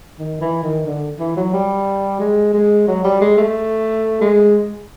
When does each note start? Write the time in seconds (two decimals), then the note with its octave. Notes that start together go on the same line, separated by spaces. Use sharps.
0.19 D#3
0.41 E3
0.63 D#3
0.86 D3
1.19 E3
1.36 F#3
1.53 G3
2.20 G#3
2.54 G#3
2.87 F#3
3.04 G3
3.21 G#3
3.38 A3
4.21 G#3